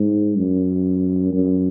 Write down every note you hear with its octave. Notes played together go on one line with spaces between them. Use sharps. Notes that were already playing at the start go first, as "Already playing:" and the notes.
Already playing: G#2
F#2
F#2